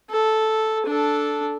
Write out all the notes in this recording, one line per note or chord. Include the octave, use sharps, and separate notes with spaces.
A4
D4 A4